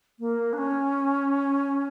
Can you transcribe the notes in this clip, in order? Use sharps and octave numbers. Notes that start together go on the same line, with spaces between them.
A#3
D4
C#4